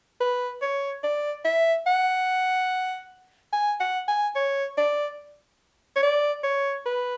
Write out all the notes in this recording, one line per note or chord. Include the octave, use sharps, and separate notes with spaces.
B4
C#5
D5
E5
F#5
G#5
F#5
G#5
C#5
D5
C#5
D5
C#5
B4